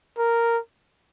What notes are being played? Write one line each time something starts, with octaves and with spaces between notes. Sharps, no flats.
A#4